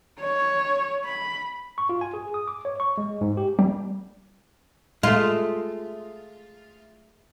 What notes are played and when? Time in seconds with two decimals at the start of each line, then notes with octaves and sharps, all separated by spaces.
0.20 C#5
1.05 B5
1.78 C#6
1.89 F4
2.01 G#5
2.14 G#4
2.34 D#6
2.48 D6
2.65 C#5
2.80 C#6
2.98 G#3
3.21 G#2
3.37 G4
3.59 G3
5.03 G#3 A3 F4